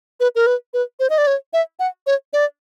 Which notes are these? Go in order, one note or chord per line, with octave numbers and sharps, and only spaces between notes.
B4
A#4
B4
B4
C5
D#5
D5
C#5
E5
F#5
C#5
D5